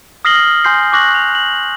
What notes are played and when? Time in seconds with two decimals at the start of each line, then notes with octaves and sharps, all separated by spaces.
0.25 D#6 F6 A#6 C7 F#7 G7
0.64 G#5 C6 G6 C7
0.92 C#6 D6 F#6 A#6 F#7
1.15 F7
1.35 F#7